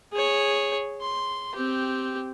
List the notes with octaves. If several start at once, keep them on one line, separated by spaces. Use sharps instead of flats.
G#4 C#5
C6
C4 G4